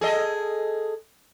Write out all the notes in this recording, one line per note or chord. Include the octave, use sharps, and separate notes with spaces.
G#4 A4 D#5